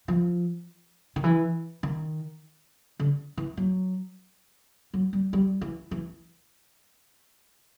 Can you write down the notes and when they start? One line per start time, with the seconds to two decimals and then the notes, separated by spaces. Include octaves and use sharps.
0.08 F3
1.16 D#3
1.24 E3
1.83 D#3
2.99 D3
3.37 E3
3.57 F#3
4.94 F#3
5.13 G3
5.33 G3
5.61 E3
5.91 E3